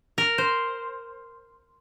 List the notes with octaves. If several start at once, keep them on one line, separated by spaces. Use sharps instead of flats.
A#4
C5